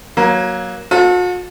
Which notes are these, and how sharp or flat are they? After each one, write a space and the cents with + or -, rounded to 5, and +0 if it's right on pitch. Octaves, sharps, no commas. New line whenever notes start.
F#3 +0 A#3 +20
F#4 -45 A4 +0 C5 +0